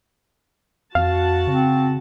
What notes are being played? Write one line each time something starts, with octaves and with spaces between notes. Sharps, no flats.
F2 F#4 F5 A5
C#3 C4